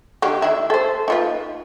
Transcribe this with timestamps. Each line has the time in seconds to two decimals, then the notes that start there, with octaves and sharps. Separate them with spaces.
0.22 D3 D#3 G4
0.42 D#3 E4
0.70 A4 C5
1.08 D#4 F4 B4